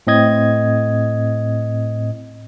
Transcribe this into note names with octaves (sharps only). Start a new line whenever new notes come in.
A2 C4 D#5 G#6